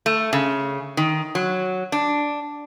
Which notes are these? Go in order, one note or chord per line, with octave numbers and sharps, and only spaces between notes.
A3
C#3
D#3
F#3
D4